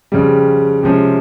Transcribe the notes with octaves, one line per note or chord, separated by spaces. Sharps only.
F2 C#3 G3
C3 F3 G#3 C#4